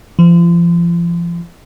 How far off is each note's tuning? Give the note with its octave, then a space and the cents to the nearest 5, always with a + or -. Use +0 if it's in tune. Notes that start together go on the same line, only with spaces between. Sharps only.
F3 -35